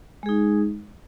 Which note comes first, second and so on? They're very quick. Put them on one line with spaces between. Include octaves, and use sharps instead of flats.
G#3 G#4 D#4